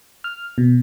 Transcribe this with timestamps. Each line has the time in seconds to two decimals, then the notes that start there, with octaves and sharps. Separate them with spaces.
0.24 F6
0.58 B2